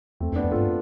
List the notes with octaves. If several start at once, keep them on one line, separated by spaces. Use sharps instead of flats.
E2 A3 C4
F2
B3 D4
F2
G2 F4 A4